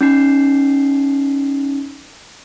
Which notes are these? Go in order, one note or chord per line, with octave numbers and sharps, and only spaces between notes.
C#4 D#4 C7